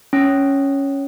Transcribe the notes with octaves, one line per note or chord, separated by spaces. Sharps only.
C#4